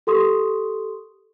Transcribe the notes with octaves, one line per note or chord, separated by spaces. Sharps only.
G4 A4 A#4 C6 C#6 D#6